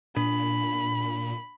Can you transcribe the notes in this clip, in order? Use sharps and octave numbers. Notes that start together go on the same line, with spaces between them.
A#2 D4 B5